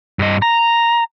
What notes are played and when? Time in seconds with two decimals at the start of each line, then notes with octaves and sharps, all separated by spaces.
0.19 G2 D#5
0.42 A#5